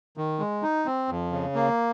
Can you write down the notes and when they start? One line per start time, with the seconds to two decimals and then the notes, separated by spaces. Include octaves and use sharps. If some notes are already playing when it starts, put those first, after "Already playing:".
0.17 D#3
0.39 G#3
0.62 D#4
0.86 C4
1.09 F2
1.32 C#3
1.55 A#3